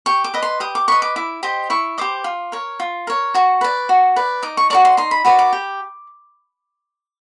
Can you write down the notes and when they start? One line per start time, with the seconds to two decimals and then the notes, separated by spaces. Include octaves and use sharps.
0.06 G4 C#6
0.24 D6
0.34 B4 D#5
0.43 C6
0.60 G4 D#6
0.75 D6
0.88 B4 D#5 C#6
1.02 D6
1.16 E4 D6
1.43 G4 C5 D#5
1.70 E4 C#6
1.98 G4 C5 D#5 D6
2.24 F4
2.52 A#4 C#5
2.80 F4
3.07 A#4 C#5
3.34 F#4 C#6
3.61 B4 D5
3.89 F#4
4.16 B4 D5
4.43 D#4 D6
4.57 C#6
4.70 F#4 A#4 D5 C#6
4.85 C6
4.97 D#4 C6
5.11 B5
5.25 F#4 A#4 D5 B5
5.39 D6
5.53 G4